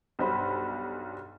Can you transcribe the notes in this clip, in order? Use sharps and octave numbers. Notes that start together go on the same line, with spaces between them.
B1 G2 C5 B5